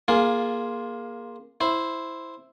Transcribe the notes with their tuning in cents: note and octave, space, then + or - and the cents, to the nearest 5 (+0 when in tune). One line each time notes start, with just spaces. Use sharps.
A#3 +20 F4 +0 G#4 +5
E4 +0 C5 +0